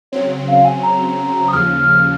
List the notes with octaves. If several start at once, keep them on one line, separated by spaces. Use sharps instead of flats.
C#3 F#3 C4 C#5
F5
G#5
A#5
D#6
D#2 C#3 F3 F6